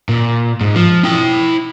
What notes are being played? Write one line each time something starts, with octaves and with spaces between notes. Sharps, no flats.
A#2
G#2
F3
E4 G5